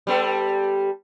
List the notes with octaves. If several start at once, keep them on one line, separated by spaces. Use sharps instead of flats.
G3 B3 A4